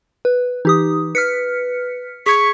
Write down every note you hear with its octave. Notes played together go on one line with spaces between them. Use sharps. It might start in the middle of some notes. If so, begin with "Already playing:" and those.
B4
E3 D#4 G4 D#6
B4 F6 B6 C#7
G#4 C#6 G#6 B6